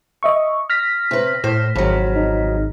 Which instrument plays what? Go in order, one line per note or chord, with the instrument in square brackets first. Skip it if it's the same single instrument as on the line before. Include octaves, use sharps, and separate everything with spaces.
[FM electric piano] D#5 E5 C#6
F6 A#6 B6
[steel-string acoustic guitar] C3 B4
[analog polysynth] A2 [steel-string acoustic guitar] C5
[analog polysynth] G#1 [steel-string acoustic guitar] F2 F#3
[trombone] D#4